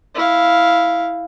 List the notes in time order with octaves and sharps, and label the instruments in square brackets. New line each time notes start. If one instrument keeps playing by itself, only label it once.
[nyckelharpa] E4 F5